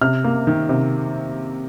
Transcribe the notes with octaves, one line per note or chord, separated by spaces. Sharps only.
C3 F6
A#3
D#3
C3